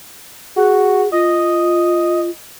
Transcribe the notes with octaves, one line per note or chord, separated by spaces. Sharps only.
F#4 G#4
F4 D#5